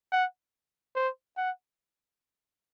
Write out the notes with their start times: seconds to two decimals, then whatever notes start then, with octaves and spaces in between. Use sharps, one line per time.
0.12 F#5
0.95 C5
1.37 F#5